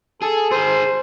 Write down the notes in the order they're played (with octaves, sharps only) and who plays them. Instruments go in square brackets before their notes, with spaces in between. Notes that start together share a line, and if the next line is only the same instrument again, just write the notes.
[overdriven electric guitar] G#4 [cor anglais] A4
[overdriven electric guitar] G#4 A#4 [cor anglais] C5